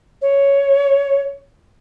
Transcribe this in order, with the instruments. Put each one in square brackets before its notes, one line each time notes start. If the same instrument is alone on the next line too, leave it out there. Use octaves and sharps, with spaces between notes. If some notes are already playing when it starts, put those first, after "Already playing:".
[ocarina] C#5